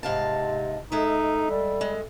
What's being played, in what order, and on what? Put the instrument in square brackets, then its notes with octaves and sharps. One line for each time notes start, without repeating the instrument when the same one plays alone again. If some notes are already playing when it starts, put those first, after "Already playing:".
[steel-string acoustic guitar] G#2 F5 A5 [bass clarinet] C3 [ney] D#5
[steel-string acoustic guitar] G#3 E5 [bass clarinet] D#4 [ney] A4
[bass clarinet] G3
[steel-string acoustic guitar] G#3